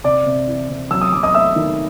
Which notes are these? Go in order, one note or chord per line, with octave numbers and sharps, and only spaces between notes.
C3 D5 D6
C3
E3
C3
F#3 E6
D#6
F#3 D6
D#5 D#6
A3 E5 E6
D#3